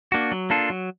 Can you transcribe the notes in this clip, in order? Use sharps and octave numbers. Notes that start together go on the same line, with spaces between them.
A#3 D4 F#4
F#3
A#3 D4 F4 A4
F#3